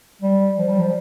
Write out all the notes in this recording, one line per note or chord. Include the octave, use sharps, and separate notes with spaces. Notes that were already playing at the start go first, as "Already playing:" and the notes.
G3
F3
G3
F3